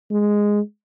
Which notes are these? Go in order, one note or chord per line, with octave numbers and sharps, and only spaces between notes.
G#3